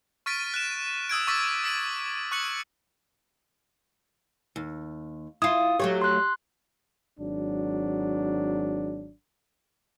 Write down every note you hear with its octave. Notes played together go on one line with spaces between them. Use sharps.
C#6 F6 A6 B6 D7 D#7
F#6 E7
D#6 E6 G#6 D7
C#6 D6 E6 A6 B6
E6 B6 D7 F#7
C#6 F#6 C#7 F#7
D#2
E4 F4 D#6
F#3 A3 G4 C#5
C6 F#6
G#1 F#3 D4